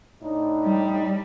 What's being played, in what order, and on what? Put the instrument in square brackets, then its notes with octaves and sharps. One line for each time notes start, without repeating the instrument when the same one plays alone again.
[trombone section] A2 D4 D#4
[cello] G3